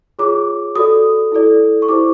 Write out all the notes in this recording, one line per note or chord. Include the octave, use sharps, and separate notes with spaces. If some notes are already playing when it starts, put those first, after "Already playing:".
F4 G#4 C#5 D6
F#4 A4 D5 D#6
E4 A4 D5
C#6
E4 G4 C5 D6